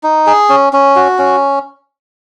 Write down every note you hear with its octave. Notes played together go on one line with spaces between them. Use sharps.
D#4
G#4
C#4
C#4
F#4
C#4